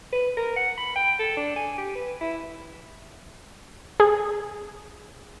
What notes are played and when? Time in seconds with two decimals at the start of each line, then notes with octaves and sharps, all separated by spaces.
0.12 B4
0.37 A#4
0.56 F#5
0.78 B5
0.96 G5
1.19 A4
1.37 D4
1.56 G#5
1.78 G4
1.95 B4
2.21 E4
4.00 G#4